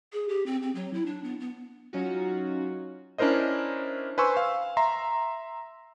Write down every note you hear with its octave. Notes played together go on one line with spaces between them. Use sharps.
G#4
G4
C4
C4
F#3
E4
D4
B3
B3
F#3 C#4 D#4 F4 F#4
C#4 D4 E4 A#4 C5 D#5
B4 C5 G#5 C6 C#6 E6
F5
E5 A#5 C6